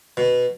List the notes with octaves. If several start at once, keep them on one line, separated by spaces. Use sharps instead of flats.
B2